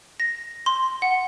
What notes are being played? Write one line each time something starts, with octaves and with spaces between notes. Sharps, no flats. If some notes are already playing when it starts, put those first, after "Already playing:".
A#6
C6
F#5